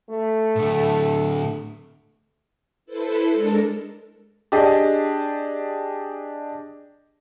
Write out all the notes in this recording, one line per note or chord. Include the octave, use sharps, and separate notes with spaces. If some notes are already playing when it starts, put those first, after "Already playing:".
A3
A2 D3
E4 A4 B4 C5
G#3 D4 A4 A#4
D4 G4 G#4 D#5